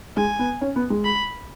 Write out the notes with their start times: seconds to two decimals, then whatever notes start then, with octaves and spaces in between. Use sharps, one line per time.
0.17 G#3 G#5
0.39 B3
0.61 C#4
0.76 B3
0.90 G#3
1.05 B5